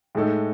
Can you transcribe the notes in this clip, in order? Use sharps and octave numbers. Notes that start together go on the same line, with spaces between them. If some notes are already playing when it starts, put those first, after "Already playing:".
A2 G#3 D#4 A4